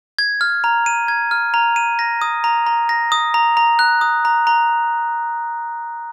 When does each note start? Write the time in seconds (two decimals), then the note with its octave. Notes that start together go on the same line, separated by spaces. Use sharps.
0.19 G#6
0.41 F6
0.64 A#5
0.86 D#7
1.08 G#6
1.31 F6
1.54 A#5
1.76 D#7
1.99 A#6
2.22 D#6
2.44 A#5
2.67 A#5
2.89 A#6
3.12 D#6
3.34 A#5
3.57 A#5
3.79 F#6
4.01 D#6
4.25 A#5
4.47 A#5